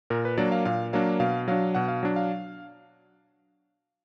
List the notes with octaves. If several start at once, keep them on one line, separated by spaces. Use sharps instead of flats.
A#2 A#4
B4
F#3 A#3 D4 D5
F5
A#2 F5
F#3 A#3 D4 F5
B2 F5
F#3 D4 F5
B2 F#5
F5
F#3 D4
F5